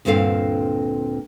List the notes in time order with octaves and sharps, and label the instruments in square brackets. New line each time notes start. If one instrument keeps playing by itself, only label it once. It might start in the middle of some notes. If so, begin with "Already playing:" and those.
[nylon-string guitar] D2 G2 A#2 C4 A4 F5